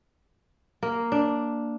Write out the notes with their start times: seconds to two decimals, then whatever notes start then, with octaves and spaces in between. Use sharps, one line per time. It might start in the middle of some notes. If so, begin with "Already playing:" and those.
0.83 A#3
1.12 D4